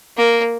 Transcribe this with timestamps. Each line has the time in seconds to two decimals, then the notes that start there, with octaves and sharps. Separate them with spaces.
0.17 A#3